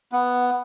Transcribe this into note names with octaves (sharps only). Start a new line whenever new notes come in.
B3